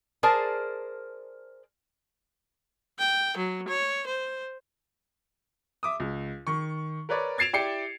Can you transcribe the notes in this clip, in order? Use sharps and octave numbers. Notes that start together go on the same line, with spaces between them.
G#4 A#4 C5 D5 A5
G5
F#3
C#5
C5
E5 D6 D#6
C#2
D#3 C#6
A#4 B4 C#5 D5
G#6 A6 C7 D7 E7 F7
E4 G4 D5 G5 C7 C#7